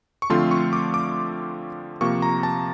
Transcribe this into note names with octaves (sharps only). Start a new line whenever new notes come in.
C#6
D3 F3 A3 C4 F4 C6
C#6
D6
D6
C3 F3 A#3 C#6
A#5
A5